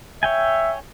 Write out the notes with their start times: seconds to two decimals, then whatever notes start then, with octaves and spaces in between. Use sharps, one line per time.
0.23 C#5 E5 G5 G#5